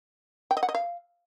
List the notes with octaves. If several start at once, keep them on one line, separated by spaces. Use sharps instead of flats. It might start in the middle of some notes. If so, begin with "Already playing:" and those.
G5
D#5
F#5
D#5
F5